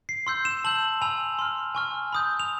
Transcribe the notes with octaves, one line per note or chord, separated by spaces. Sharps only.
C7
C6 E6 G6 C7
E7
A5 C6 E6 G6 F#7
G#5 B5 E6 F7
C6 F6
G#5 C#6 F6
B5 D#6 G6
F7